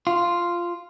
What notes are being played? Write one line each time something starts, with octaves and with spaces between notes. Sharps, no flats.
F4